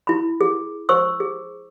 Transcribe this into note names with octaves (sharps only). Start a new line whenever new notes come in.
E4 B5
G#4
C5 C#6 E6
G#4